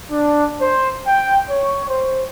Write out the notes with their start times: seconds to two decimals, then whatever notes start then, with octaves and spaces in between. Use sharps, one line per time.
0.11 D4
0.60 C5
1.07 G5
1.50 C#5
1.89 C5